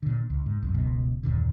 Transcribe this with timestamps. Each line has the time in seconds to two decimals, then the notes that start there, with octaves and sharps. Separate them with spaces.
0.03 A#2 D3
0.30 C#2
0.46 G#2
0.62 C2 F#2
0.74 E1 C#2 B2
1.23 F#1 D#2 A#2 D3